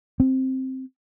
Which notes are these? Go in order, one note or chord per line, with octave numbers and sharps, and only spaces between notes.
C4